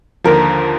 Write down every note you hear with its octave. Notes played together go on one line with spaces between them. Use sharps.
D#2 D3 F3 A#4